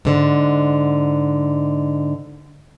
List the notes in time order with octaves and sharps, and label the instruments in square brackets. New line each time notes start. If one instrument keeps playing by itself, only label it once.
[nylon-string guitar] G#2 D3